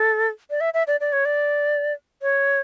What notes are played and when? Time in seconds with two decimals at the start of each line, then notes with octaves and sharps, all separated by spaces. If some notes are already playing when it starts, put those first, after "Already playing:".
Already playing: A4
0.50 D5
0.61 E5
0.74 E5
0.87 D5
1.01 D5
1.13 C#5
1.25 D5
2.22 C#5